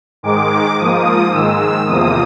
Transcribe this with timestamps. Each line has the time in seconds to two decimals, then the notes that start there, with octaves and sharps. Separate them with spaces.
0.23 G#2 D#3 G#3 D6
0.78 G#2 F3 A#3 D#6
1.32 G#2 D#3 G#3 E6
1.86 E2 C3 F3 A#3 D#6